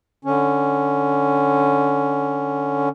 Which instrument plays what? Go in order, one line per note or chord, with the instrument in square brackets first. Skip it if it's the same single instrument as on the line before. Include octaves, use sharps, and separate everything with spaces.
[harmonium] D3 C#4